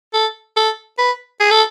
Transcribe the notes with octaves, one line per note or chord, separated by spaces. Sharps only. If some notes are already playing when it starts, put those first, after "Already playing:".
A4
A4
B4
G#4
A4